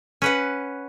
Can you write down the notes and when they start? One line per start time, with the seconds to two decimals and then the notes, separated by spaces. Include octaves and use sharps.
0.22 C#4 B4 F#5